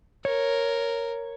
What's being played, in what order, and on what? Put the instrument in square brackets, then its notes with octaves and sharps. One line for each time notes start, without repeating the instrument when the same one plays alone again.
[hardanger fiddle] A#4 [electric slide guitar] C#5